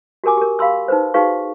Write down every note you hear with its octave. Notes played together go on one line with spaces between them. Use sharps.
F#4 G4 A#4 G#5 D6
G4 A#4
G4 F5 B5 C6 E6
D#4 B4 C5
D#4 F#4 G#4 B4 F5 C#6